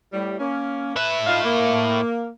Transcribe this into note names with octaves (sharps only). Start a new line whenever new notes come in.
A2 G3
A#3 C#4
A2 B4 E5
D#4 F4 F5
A#3